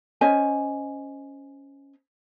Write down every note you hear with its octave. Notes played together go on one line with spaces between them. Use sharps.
C#4 C5 D#5 G#5